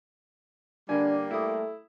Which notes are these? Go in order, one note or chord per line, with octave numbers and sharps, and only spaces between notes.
D3 G3 A#3 D4 G#5
A3 E4 D#6